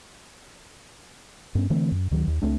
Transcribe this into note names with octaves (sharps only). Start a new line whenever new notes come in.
G2 B3 C#4
D3 E3 A3 C4
F#2
D2 D#3 F#3
D#2
C#2 A3 C4 D4